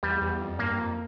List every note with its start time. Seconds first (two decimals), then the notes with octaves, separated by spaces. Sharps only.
0.03 E2 G3
0.21 E2
0.41 F2
0.59 G2 A#3
0.79 F2